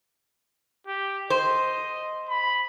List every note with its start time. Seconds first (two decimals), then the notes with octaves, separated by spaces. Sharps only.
0.87 G4
1.30 C5 D#5
2.29 B5